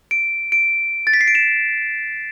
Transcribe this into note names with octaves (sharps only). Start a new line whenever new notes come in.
D7
D7
A6
B6
C7
D7
E7